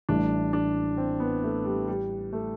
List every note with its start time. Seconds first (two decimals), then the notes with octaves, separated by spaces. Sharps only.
0.09 A1 A2 G3 D4
0.53 D4
0.98 C4
1.20 B3
1.44 A3
1.65 G3
1.88 G3
2.33 A3